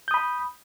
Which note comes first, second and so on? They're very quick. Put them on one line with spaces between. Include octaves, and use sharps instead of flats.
G6 D#6 B5